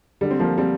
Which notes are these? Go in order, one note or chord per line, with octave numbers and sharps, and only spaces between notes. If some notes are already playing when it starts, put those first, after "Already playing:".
D3 G3
C4
F3 A#3
G3 C4